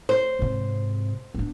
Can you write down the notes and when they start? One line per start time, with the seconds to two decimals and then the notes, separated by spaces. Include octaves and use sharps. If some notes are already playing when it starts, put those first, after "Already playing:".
0.09 C5
0.39 G#2 C3
1.34 B3 D4